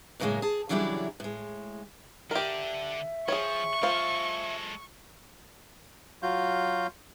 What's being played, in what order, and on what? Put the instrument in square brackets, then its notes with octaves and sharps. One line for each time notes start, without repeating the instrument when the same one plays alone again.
[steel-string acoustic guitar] F#2 A2 C#3 E3 G#3 A#3
G#4 A5
C#3 E3 F#3 G3 D4 E4
A2 G#3
[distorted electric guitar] D3 D4 [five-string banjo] G4 A#4 [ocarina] E5
[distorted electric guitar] F3 [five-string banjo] G#4 C#5 [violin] C#6
[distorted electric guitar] G#3 A4 [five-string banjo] F4 C5 F5
[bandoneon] F#3 F4 F#4 F5 G6